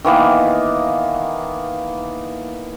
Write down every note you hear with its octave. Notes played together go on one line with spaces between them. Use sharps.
D#3 E3 A#3 B3